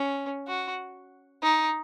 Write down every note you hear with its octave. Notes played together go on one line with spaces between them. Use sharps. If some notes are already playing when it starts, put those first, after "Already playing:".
Already playing: C#4
F#4
D#4